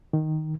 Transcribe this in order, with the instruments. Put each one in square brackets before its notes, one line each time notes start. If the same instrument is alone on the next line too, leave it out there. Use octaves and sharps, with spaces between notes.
[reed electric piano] D#3